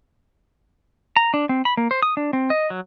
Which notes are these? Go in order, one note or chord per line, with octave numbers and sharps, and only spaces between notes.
A#5
D4
C4
B5
A#3
C5
D#6
D4
C4
D#5
F#3